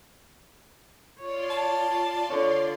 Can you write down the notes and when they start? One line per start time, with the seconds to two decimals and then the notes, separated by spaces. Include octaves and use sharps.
1.19 F4 C#5 D5 C6
1.50 A5
2.30 D3 C#5